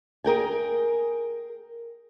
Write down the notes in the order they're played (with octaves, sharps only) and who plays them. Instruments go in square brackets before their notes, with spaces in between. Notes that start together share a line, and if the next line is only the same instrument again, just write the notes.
[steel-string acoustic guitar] G#4 A#4 G5 G#5